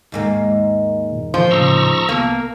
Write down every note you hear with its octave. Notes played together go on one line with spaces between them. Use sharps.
D#2 G#2 A#3
E2 A#2
F3 C5 F5 C6
A2 C#3 A#5 C#6 E6
C2 A#3 B3 A5